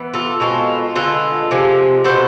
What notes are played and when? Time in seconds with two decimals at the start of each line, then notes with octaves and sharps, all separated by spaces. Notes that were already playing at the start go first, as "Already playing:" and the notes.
Already playing: E3 B3
0.14 F4 A4
0.40 B2 G#3 C4 F4 A4
0.96 D3 G#3 B3 F4 A4
1.51 C3 F3 G#3
2.04 B2 B3 A4 C5